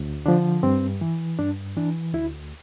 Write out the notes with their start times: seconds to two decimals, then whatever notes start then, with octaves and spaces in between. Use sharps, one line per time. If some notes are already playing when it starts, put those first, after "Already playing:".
Already playing: D2
0.26 D3 F3 D4
0.63 G2 C4
1.01 E3
1.39 G2 D4
1.77 E3 D4
2.14 D2 E4